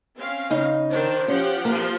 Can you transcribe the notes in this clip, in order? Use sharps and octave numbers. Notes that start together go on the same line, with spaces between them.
C4 C#4 F5
C#3 D#4 D#5
D#3 D4 C5
F3 C#4 G4 F#5
F3 A#3